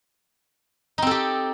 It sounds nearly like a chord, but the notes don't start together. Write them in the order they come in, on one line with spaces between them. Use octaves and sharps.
D#4 C4 A4 G4